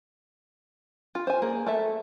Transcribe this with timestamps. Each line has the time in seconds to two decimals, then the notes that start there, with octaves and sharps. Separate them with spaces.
1.15 F4
1.27 C5 G#5
1.42 A#3 G#4
1.66 A3 A4 E5